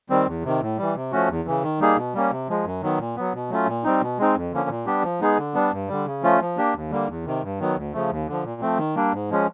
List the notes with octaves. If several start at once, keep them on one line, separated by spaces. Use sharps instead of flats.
D#3 G3 C4
E2
C3 D#3
A2
E3 G3
C3
F3 A3 C#4 F#4
E2
C#3 E3
D#3
G3 A#3 D#4 G#4
B2
G3 A#3 C#4
C3
F3 G#3
F#2
D#3 F#3 B3
A#2
F#3 B3
B2
F#3 A3 C#4 F4
A#2
G3 C4 D#4
B2
G#3 C4 D#4
F2
D3 F3 A#3 C#4
A#2
G3 B3 D4 G4
F3
G#3 B3 D#4 G#4
D3
G3 B3 D4
G2
D3 G3
C#3
F3 A3 C#4 F4
F3
A#3 D4 G4
D#2
D3 G3 A#3
E2
C3 D#3
G2
D#3 F#3 B3
D2
C#3 F3 A3
D#2
D3 F3
A#2
F3 A3 C4
D#3
G3 A#3 D4
G#2
F3 G#3 C#4